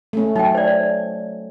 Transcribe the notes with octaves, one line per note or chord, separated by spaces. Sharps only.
A3 C#4
F#3 D#4 G5
C5 D5